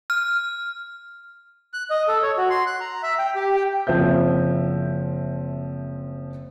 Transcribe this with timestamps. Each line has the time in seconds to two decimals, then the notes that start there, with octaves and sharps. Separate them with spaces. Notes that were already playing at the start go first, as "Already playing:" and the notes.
0.10 F6
1.73 F#6
1.90 D#5
2.08 A4
2.23 C#5
2.38 F#4
2.50 C6
2.66 F#6
2.80 A#5
3.03 E5
3.19 G5
3.35 G4
3.56 G5
3.87 F#1 F3 C4 E5 G6